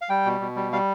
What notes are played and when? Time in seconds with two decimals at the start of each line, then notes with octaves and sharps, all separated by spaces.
0.01 F5
0.09 G3 G5
0.25 B2
0.41 B2
0.56 G3
0.72 G3 F5